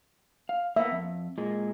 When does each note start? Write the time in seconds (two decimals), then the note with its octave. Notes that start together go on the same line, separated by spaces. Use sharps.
0.49 F5
0.76 A#3 B3 E5
0.92 F2
1.38 A#2 G#3